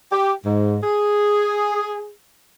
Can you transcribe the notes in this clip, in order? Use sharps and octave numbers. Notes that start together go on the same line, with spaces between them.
G4
G#2
G#4